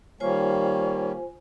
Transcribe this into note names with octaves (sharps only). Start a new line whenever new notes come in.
D#3 G3 A#3 F4 C5 C#5 G#5